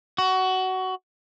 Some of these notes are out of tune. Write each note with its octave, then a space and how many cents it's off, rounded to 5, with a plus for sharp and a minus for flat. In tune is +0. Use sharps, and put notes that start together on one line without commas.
F#4 +20